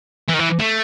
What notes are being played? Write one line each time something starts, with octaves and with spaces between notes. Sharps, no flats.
E3
D#3
E3
A3